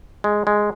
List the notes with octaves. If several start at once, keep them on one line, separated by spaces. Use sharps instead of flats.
G#3
G#3